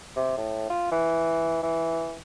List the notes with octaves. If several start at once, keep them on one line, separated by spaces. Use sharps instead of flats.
C3
A2
F4
E3
E3